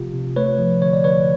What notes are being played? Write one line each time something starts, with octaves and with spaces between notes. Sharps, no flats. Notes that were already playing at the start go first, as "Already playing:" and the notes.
Already playing: C3 F3 A3 F4 G4
C3
A3 B4 C#5
F3
D3 C#5
D5
D3 B4 C#5